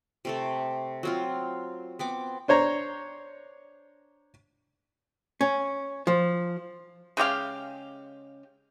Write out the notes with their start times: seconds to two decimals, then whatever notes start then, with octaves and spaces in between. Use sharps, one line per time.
0.25 C3 A3 A4
1.03 F#3 C4 F4
1.99 B3 C4 D6
2.48 D4 C5 C#5 A#5
5.41 C#4
6.07 F3
7.17 C#3 G#3 G4 F5